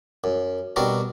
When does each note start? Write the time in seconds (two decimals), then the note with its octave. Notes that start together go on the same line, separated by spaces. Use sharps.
0.24 F#2
0.76 B2 G3 C4 D4 F#4 A#4